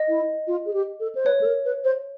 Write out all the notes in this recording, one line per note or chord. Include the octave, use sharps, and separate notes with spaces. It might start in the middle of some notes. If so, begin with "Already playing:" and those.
Already playing: D#5
E4
F4
G#4
G4
A4
C5
B4 C#5
A4
A#4
B4
C5